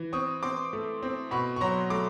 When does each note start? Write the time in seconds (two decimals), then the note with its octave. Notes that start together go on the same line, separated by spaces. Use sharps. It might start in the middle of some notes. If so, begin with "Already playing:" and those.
Already playing: E3
0.13 C4 C#6 D#6
0.43 C4 C6 D6
0.73 A3
1.02 C4
1.31 B2 B5 C#6
1.56 C#6
1.61 F#3 A#5 C6
1.90 A3 C6 D6